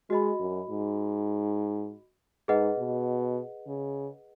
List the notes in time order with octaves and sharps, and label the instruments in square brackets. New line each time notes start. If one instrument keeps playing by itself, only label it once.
[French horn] G#3 [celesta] F#4 D#5 B5
[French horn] F#2
G#2
[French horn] G#2 [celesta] G#4 B4 D#5 F#5
[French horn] B2
C#3